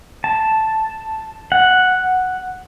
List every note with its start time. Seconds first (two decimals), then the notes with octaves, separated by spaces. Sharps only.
0.24 A5
1.52 F#5